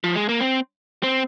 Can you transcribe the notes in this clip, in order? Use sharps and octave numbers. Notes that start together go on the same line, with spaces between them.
F3
G#3
A#3
C4
C4